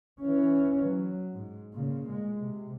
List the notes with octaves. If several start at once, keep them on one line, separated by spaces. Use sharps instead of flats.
E3 C#4
F#3
G#2
A#2 C#3
G#3
C3